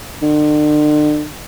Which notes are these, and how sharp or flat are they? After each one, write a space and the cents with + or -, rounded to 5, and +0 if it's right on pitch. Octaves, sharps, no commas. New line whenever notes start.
D3 +40